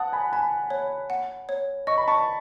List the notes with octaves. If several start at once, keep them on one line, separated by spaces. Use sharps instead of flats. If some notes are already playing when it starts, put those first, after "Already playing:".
Already playing: F#5 A5 D#6
G#5 B5
G#5 A5 B5
C#5
F#5
C#5
D#5 C#6
B5
A5 C#6